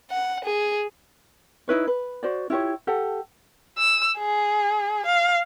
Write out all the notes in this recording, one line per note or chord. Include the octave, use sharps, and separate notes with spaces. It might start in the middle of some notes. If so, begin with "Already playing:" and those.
F#5
G#4
D#4 E4 B4 C#5
B4
F#4 C5 D5
E4 F4 G4 C#5
G4 A4 F#5
E6
G#4
F5